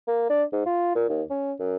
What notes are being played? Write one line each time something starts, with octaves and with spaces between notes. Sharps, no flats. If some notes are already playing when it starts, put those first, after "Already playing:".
A#3
D4
G#2
F4
A#2
D#2
C#4
F#2